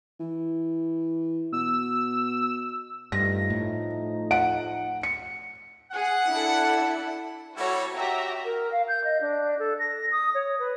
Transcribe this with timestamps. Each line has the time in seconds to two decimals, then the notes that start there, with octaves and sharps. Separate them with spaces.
0.20 E3
1.53 B2 E6
3.12 G2 F3 A3 D#4 A#6
3.50 A2
4.31 F#5 D7
5.03 C#7
5.92 G#4 F#5
6.28 D4 E4 A4
7.56 G3 E4 F#4 A4 C#5
7.97 F#4 G4 E5 A#5
8.44 A#4
8.71 F5
8.88 G6
9.04 D#5
9.20 D4
9.58 A4
9.79 A#6
10.11 D#6
10.34 C#5
10.59 B4